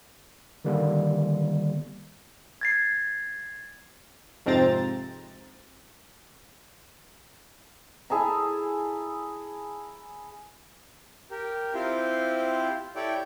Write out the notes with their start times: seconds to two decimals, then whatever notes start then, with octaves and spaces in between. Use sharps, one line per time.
0.65 D3 D#3 G3 A#3 B3
2.61 G#6 A6 C7
4.46 F2 G#2 C3 C4 A#5 A6
8.10 E4 G#4 A5 A#5
11.31 G4 A#4
11.74 C4 E4 F4 G4 C5
12.96 E4 G4 A4 C#5 D5 G5